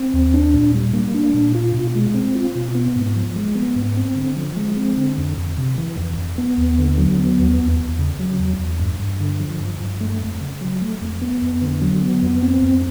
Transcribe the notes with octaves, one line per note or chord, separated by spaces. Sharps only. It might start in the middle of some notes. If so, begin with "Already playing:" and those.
Already playing: C4
D#2
D4
A#2
G3
A#3
D4
A#2
F4
B2
G#3
C4
F4
B2
B3
G#2
F3
G#3
B3
G#2
C4
D3
F3
G#3
C4
D3
F2
F2
C3
E3
F2
F2
B3
D#2
D3
F#3
B3
D#2
E2
E2
C#3
F#3
E2
E2
G2
G2
D3
F3
G2
G2
A3
F2
C#3
F#3
A3
F2
B3
F2
D3
F#3
B3
F2
C4
F2